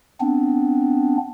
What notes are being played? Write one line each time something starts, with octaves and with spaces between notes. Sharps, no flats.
B3 C4 D4